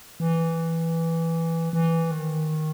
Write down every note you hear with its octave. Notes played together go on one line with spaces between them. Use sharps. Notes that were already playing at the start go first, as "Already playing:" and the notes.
E3
E3
D#3